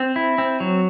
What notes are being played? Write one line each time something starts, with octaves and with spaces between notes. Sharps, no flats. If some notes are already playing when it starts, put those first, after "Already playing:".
Already playing: C4
E4
C4
F#3